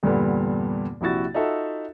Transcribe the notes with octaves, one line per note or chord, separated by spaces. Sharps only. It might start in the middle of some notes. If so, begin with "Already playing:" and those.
E2 G2 A#2 D3 G3 B3
A#1 C3 E4 F#4 A6
D#4 F4 F#4 A4 E5 F#5